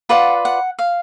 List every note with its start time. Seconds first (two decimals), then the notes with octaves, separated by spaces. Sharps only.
0.09 F4 B4 D5 F#5
0.45 F#5
0.79 F5